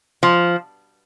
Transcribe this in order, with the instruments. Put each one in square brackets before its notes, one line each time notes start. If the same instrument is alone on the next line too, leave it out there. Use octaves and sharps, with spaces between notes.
[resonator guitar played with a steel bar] F3